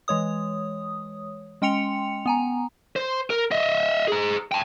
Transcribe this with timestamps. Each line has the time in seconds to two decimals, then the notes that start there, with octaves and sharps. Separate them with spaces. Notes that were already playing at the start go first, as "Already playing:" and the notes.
0.08 E3 G#3 C#5 D#6
1.62 G#3 C#4 G5 C6 C#7 F7
2.26 B3 G#5 A#5
2.96 C5
3.30 A#4
3.51 D#5 E5
4.08 G#4 A#5
4.52 G5 A5